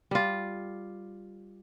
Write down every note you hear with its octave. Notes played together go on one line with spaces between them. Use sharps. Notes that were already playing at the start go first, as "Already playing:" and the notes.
G3 F4